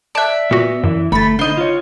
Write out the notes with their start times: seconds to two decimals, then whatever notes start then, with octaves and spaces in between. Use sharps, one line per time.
0.15 D5 E5 A5 F#6
0.51 A#2 B3 F#4
0.84 F#2 E3
1.12 G1 A3 B5 A6
1.39 D3 D#4 C5 D#5
1.57 F4 C#5